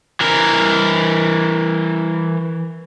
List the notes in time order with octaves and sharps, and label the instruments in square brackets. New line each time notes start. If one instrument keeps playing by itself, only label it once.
[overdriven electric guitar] E3 A#4